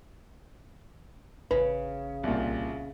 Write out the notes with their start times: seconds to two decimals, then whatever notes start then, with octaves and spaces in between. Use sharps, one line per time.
1.51 A1 C#3 B4
2.23 C2 A#2